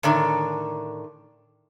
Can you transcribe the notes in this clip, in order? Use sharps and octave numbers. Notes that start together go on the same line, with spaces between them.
A2 D3 D#3